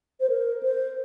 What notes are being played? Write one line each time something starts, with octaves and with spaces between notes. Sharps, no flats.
C5
A#4
C5